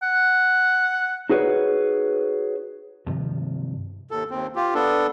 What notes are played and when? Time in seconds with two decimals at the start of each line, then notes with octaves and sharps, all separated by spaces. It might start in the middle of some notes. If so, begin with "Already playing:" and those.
0.02 F#5
1.29 D#4 F#4 G#4 B4 C#5
3.07 G2 C3 D#3 F3
4.11 D#2 A4
4.31 D#2 C4
4.56 F4 G4
4.74 B3 D4 A4